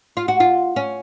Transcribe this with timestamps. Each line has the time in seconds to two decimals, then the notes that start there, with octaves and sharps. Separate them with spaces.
0.17 F4
0.28 F#4
0.40 F4
0.76 C#4